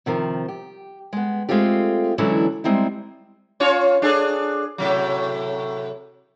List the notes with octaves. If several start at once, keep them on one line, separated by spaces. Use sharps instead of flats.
C3 D#3 F3
G4
G#3 B3
G#3 A3 C4 F4 G4
D3 E3 F#3 G#3 C#4 E4
G3 G#3 C4 D#4 E4
C#4 F4 C#5
D4 G#4 A4
A2 C3 F#3